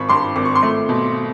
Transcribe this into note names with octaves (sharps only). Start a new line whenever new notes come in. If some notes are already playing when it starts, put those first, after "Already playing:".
Already playing: G#1 B5 C#6
G2 C6 D6
G#1 D6
C#6
C6 D6
A3
B2